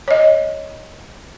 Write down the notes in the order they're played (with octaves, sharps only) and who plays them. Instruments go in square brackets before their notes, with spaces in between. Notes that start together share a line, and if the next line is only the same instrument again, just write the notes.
[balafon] C#5 D#5